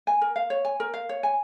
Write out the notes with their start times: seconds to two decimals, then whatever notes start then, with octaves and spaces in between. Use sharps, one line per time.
0.07 G#5
0.21 A#4
0.36 F5
0.50 C#5
0.65 G#5
0.80 A#4
0.94 F5
1.09 C#5
1.23 G#5